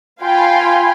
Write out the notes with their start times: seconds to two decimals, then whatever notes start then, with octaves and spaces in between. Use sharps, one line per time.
0.22 F4 F5 G5 G#5 B5 C6